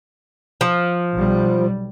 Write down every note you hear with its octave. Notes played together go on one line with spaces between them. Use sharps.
F3
B1 G3